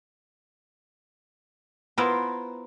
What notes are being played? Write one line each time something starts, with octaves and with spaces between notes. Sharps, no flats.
B3 E4 F4 A#4 C5